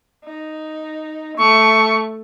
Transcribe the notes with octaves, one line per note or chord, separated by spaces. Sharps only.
D#4
A3 C#6